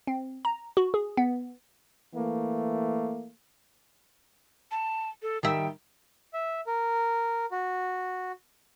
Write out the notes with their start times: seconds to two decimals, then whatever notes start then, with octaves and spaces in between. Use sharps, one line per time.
0.07 C4
0.45 A#5
0.77 F#4
0.94 G#4
1.17 B3
2.14 E3 A3 A#3
4.71 A5
5.22 A4
5.43 D#3 G3 E5 G5
6.33 E5
6.67 A#4
7.51 F#4